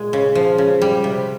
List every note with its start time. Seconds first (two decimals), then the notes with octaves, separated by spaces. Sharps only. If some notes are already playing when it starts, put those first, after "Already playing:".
Already playing: A#2 G#3
0.13 C#3
0.35 F3
0.58 C#3
0.82 G3
1.04 C3